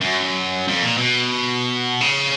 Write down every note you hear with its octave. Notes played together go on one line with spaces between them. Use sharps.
F#2
F2
A#2
B2
C#3